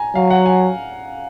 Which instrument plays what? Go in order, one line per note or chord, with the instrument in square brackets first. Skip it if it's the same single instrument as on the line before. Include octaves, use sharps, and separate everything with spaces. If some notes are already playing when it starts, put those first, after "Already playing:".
Already playing: [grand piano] G#5 A#5
[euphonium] F#3 [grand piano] F5
[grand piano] F#5
G#5